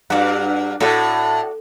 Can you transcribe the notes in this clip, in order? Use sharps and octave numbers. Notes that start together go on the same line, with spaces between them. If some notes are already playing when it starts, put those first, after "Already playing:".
G2 F#4 A4 D5 F#5
A2 F#4 A4 D5 F#5